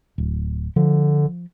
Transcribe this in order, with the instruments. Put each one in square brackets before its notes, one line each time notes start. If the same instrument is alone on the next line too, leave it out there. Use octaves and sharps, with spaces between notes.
[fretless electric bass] D1
[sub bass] D3 [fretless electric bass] F3